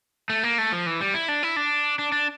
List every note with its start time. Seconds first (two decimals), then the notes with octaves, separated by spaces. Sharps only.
0.30 A3
0.43 A#3
0.58 A3
0.72 F3
0.86 E3
1.01 G3
1.14 E4
1.29 D4
1.43 E4
1.56 D4
1.99 D4
2.12 D4